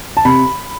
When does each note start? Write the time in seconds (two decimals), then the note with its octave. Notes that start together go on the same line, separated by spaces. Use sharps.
0.17 A5
0.25 C3 B5